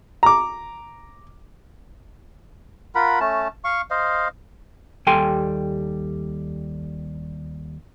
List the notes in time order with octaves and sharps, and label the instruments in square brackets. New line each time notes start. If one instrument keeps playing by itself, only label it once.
[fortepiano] A#5 D6
[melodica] F4 A#4 F#5 B5
A3 C#4 A5
F5 C#6
C5 D#5 F5
[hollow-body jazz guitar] D#2 G3 A4 G5 G#5 C6